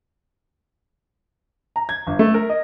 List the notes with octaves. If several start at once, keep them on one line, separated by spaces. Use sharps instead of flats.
A#5
G#6
G1
A3
A#4
D#5